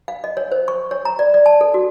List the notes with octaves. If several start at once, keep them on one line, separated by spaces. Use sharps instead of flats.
F5
D#5
C#5
C5
C#6
C#5
A#5
D5
D5
A5
A4
F#4